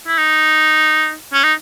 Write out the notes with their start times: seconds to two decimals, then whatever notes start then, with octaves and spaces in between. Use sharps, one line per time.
0.07 E4
0.18 D#4
1.33 C#4
1.44 D#4